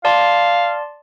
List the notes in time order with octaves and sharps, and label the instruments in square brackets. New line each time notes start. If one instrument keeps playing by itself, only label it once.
[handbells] D5 A5 C6 [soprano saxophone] F5